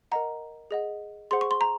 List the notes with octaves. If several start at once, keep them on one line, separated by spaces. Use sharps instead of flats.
A#4 D#5 F#5 A#5
G#4 D#5 F#5
G#4 C5 F#5 C6
C#6
C6
A#5